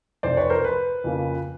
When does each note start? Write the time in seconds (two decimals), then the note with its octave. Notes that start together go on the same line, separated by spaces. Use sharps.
0.23 F1 F2 C3 C5 D5
0.37 B4 C#5
0.50 A#4 C5
0.64 B4
1.04 F2 C#3 F3 A#3